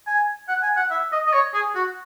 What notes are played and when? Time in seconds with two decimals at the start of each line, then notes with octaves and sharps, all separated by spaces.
0.07 G#5
0.48 F#5
0.62 G#5
0.76 F#5
0.91 E5
1.12 D#5
1.26 D#5
1.33 C#5
1.53 G#4
1.75 F#4